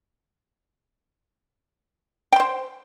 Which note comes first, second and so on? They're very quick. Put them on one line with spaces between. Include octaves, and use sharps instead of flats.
G5 C6 C5